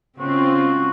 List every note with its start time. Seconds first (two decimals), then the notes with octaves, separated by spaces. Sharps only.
0.19 C#3 G#3 C4 F4 F#4